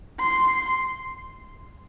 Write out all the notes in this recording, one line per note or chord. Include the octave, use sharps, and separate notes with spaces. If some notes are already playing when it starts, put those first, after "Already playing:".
C6